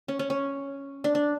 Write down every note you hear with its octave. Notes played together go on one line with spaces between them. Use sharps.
C#4
C#4
C#4
D4
D4